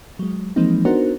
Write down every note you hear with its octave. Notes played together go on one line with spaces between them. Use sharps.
F#3 G#3
E3 F3 G#3 A#3 C4 D#4
B3 D4 D#4 F#4 A#4 C5